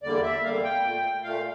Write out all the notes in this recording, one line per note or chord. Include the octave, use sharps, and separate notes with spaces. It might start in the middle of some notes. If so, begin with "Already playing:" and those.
E2 D3 G3 A#3 D5
E5
E2 D3 G3 A#3 F5
G5
A#2 A3
A#2 A3 F5